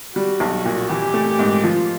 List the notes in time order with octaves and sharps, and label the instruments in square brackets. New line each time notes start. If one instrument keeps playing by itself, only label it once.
[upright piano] G3 [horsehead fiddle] F#4
[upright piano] B1
A#2
[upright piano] E3 [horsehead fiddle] G4
[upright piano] A3
G#2
[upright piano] F3 [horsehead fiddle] F4